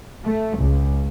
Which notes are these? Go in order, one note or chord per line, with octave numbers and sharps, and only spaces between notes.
A3
C#2